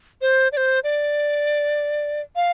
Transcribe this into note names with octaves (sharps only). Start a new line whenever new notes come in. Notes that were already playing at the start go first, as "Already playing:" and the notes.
C5
D5
C5
D5
F5